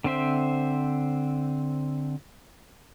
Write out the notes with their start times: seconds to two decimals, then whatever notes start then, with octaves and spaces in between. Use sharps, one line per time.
0.04 D3 C4 C5 E5